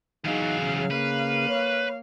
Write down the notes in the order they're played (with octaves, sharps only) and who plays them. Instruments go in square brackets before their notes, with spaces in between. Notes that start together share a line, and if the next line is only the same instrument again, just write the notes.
[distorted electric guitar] E2 F#3 [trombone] D#4 [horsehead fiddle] G#4 F5
[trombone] C#3
[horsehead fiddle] A#3 F5 [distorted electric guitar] B4
[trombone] C#5